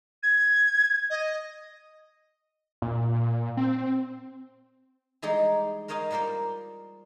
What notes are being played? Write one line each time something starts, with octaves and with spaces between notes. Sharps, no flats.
G#6
D#5
A#2
C4
E3 G3 G#3 D#4 G4 G#4
A#4 C5 C#5 D#5 F5 G#5
G3 A#3 F4 A#4 C5